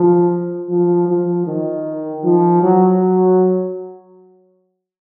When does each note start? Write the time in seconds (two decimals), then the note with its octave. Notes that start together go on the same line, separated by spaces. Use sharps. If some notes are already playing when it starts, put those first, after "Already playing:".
Already playing: F3
0.69 F3
1.08 F3
1.47 D#3
2.24 F3
2.63 F#3